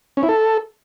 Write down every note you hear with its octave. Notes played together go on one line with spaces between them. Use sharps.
C#4
E4
A4